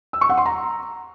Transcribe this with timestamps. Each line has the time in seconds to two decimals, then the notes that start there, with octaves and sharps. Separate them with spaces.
0.13 E6
0.21 C#6
0.29 F#5
0.37 C6
0.46 A#5